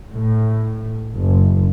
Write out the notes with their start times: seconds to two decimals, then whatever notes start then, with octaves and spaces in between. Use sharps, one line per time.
0.15 A2
1.15 F#1